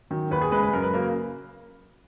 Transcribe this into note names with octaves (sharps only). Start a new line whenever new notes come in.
D#3 F#3
D#2 B4
G#4
C#3 G#3 B4
B4
F#2 A#4
B4
C#3 F#3 A#3 A#4